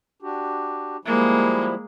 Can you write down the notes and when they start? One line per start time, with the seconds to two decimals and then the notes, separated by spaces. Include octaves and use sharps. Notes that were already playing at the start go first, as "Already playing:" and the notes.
0.22 D4 F#4 G4
1.05 F3 G3 G#3 A#3 E4